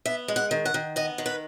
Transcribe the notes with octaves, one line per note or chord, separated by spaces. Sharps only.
B3 E5
G#3
F#5
D#3
F#5
D#3
B3 D#5
D#3
B4